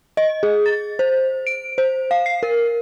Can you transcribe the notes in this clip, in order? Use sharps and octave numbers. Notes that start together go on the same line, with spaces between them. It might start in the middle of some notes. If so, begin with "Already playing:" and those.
D#5
G#4
A6
C5
D7
C5
F5
C7
A#4